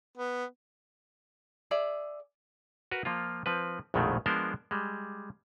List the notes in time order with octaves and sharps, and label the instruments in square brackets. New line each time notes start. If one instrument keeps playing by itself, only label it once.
[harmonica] B3
[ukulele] G#4 D5 E5
[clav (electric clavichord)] F#4 A#4 B4
F3 A#3 F4
F3 C4 B4
A#1 F2 B2 D#3 G#3 A3
F3 G#3 B3 D4 A#4 C5
G3 G#3